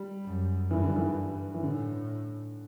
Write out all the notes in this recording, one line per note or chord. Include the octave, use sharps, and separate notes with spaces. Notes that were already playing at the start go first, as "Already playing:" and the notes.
Already playing: G3
F#2
G2 E3
D3
E3
E3
A2 D3